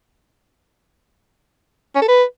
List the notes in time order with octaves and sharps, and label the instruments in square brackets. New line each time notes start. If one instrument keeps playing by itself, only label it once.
[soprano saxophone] C#4
A4
B4